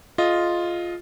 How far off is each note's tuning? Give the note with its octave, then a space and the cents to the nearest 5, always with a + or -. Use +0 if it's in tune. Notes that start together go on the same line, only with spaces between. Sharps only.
F4 +0 G#4 +40 D#5 +0